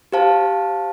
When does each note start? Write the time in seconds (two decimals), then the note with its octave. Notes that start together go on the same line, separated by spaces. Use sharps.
0.12 G4 C5 F5 A5